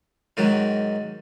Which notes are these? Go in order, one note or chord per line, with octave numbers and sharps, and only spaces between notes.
G#2 D#3 F#3